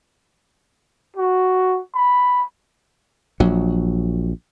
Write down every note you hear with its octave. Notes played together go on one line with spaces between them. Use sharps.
F#4
B5
A#1 F#3